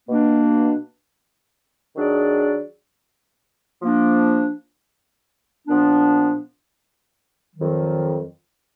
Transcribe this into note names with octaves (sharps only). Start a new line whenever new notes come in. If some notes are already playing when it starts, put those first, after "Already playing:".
B2 A#3 D4
D#3 F#3 D4 G#4 D5
F3 A#3 D4
A#2 F3 B3 D4
F2 D#3 F#3